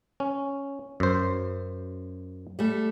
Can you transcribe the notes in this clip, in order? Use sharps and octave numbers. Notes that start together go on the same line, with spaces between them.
C#4
F#2 C5
G3 A3